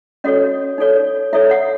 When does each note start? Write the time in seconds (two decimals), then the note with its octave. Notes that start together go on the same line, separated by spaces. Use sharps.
0.24 C#4 F#4 A4 C#5 D#5
0.78 D#4 A4 C#5
1.33 E4 A4 C#5 E5
1.51 F#5